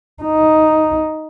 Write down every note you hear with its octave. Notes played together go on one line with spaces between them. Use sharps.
D#4